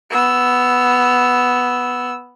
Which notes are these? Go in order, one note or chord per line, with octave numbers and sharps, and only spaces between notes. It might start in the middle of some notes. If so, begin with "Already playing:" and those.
B3 E6